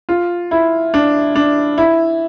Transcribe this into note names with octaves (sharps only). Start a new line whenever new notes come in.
F4
E4
D4
D4
E4